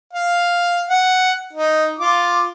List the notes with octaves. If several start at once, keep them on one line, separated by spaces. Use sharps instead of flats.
F5
F#5
D#4
F4 D6